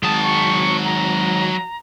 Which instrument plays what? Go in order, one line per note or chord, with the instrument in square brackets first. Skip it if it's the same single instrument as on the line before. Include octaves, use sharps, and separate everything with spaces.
[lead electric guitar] D#3 G#3 [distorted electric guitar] F#3 A5 [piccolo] D#6
[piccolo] C#6
A#5